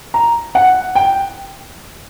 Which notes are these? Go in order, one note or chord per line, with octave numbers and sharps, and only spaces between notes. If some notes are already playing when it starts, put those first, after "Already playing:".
A#5
F#5
G5